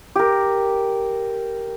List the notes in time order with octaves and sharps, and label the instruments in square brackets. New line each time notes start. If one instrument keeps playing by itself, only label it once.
[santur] G4 A#4